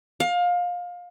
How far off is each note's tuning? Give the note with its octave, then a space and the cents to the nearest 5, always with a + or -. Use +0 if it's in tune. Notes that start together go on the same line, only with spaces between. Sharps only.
F5 +25